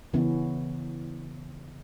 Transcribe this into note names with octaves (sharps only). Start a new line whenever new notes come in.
C#3 E3 B3 C#4